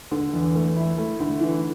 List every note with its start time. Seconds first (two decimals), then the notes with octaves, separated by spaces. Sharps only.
0.11 D3
0.34 E2
0.55 A3
0.76 E4
0.98 A3
1.20 D3
1.41 E3